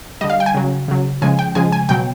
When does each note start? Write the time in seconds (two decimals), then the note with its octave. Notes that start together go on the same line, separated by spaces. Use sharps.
0.21 D3 G3 D#5
0.30 F5
0.40 G5
0.46 G#5
0.54 C#3 F#3
0.88 C#3 F#3
1.22 C#3 F3 G#3 G#5
1.39 G5
1.55 C#3 F3 G#3 G#5
1.72 G#5
1.89 B2 F#3 G5